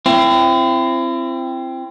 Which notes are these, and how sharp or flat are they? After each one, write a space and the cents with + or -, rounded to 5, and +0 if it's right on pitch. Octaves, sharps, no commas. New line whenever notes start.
C4 +5 E4 +40